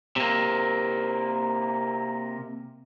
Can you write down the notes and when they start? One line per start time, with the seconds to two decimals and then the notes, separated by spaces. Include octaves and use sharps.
0.16 C3 A#3